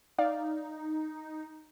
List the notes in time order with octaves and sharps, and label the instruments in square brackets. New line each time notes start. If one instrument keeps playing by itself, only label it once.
[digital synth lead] D#4 [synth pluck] D5 F5